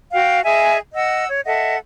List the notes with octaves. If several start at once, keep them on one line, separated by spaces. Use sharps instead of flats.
F#4 F5 G5
G#4 D#5 E5 G#5
D#5 F#5 E6
C#5
A4 D#5 E5 F#5